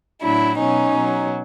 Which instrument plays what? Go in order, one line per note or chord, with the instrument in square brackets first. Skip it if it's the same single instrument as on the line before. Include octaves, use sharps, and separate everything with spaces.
[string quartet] A2 F#3 D4 E4
B2 F#3 C#4 D#4
B2 F#3